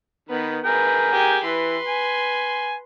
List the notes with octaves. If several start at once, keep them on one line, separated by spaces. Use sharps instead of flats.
D#3 B3 B4
G#4 A#4 B4 G5
G4 G#5
E3 B4 C6
G#5